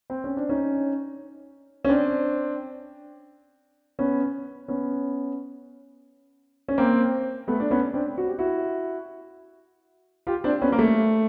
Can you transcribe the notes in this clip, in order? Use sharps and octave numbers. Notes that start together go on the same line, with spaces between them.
C4
C#4
D4
C#4 D#4
C#4
C4 D4
B3 C#4
B3 C#4
C#4
A#3 C4
A3 B3
D4
B3 C#4
C4 D4
F#4
G4
E4 F#4
F4 G4
C4 D4
B3 C#4
A#3
A3